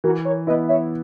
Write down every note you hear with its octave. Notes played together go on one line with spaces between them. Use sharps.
E3 F#4 A#4
A#4 C#5
B3 E4 B4 D#5
C#5 E5